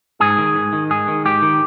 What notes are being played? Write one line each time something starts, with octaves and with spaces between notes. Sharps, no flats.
G#2 G#4
D#3
G#2
D#3
G#2 G#4
D#3
G#2 G4
D#3